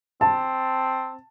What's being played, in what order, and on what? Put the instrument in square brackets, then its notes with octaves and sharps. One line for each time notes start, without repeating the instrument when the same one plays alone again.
[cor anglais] C4 [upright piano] A5